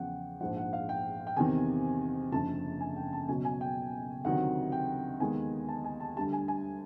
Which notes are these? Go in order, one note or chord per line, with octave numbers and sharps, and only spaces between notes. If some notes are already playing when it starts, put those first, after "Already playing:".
Already playing: E2 C#3 F3 F#5 G5
A#1 G#2 F3 F#5
F#5
F5
G5
G5
E2 C3 D#3 G#5
F#1 F#2 D3 F3 A5
G#5
G5
A5
C#2 B2 F#3 G#5
G#5
G5
D2 C3 D#3 F#3 F#5
G5
D#2 D#3 G#3 B3 G#5
A5
G#5
A5
D2 D3 G3 A5
G#5
G#5